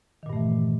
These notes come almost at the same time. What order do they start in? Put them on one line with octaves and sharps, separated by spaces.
D#3 A#2 G2 A3 E3